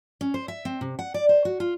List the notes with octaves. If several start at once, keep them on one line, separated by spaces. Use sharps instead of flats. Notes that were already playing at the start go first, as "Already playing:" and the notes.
C#4
C5
E5
C4
C3
F#5
D5
C5
F#4
F4